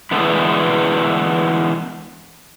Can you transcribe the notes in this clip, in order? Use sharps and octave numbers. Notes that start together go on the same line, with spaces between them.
D3 E3 G#3 A3 B3 E4